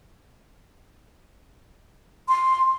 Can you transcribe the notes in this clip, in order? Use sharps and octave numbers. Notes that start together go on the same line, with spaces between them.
C6